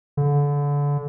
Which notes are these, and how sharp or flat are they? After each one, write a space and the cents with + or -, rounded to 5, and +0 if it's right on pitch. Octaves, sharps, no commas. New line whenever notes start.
D3 -30